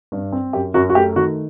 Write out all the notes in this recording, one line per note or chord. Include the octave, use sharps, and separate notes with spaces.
G2
C4
F#2 G4
F#2 F#4
F#4
A3 G4
D#3 F#4